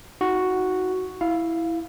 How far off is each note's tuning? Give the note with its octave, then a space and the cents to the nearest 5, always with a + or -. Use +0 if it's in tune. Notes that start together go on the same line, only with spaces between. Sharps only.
D#4 +40 F#4 +0
E4 +0 F5 +0